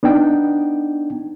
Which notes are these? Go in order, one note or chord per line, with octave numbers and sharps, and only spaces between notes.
B3 D4 D#4 G5